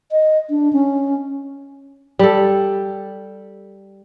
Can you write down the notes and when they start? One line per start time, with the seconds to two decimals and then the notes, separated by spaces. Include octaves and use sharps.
0.12 D#5
0.50 D4
0.73 C#4
2.19 G3 A4